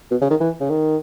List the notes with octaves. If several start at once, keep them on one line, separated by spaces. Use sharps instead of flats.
B2
C#3
D#3
E3
C#3
D#3